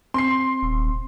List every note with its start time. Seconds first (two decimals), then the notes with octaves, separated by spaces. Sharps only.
0.14 C4 C6 C7
0.63 D#1